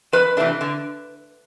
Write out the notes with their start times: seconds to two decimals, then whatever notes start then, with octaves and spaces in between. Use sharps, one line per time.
0.12 F2 B4
0.37 C3 E3 A3 D4
0.61 D3